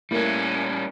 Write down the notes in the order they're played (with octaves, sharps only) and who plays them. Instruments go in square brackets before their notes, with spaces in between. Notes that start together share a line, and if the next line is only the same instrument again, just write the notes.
[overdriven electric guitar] G3 C#4 [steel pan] A3 A#3 E4